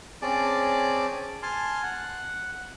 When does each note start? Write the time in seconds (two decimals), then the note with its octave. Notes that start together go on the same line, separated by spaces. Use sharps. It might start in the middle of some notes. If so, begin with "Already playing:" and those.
0.22 C4 C#4 G#4 D5 A5 D6
1.43 G#5 A5 C6 F6
1.83 F#5